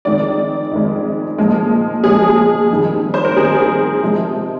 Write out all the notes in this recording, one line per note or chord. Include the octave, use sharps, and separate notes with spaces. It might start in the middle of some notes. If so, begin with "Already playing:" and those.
F2 D#3 G#3 D5
F2 D#3 G#3
A#2 F3 G#3
A#2 F3 G#3 G#4
F2 D#3 G3
C5
A#4
F2 D#3 G3 G#4
C3 F3 G#3